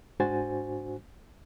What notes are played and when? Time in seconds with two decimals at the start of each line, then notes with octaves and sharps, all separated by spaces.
0.20 G#2 D4 F#4 C5 G#5 A6